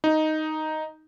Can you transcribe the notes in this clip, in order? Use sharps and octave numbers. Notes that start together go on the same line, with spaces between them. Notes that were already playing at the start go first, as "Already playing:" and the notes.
D#4